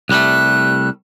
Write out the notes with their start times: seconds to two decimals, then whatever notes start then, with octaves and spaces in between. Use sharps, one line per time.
0.09 C2 G3 A3 F#6